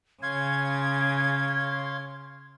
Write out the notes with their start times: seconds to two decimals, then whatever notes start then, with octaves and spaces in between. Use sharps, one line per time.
0.23 C#3 C#5 F5 C6 G#6